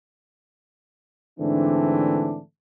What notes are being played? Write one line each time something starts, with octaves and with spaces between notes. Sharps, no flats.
G#2 D3 E3 A3 C4 D4